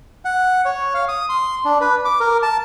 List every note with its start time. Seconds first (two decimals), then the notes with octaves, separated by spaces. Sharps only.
0.25 F#5
0.65 C#5
0.94 F5
1.08 D#6
1.29 C6
1.65 D4
1.81 B4
2.05 D6
2.20 A#4
2.43 A5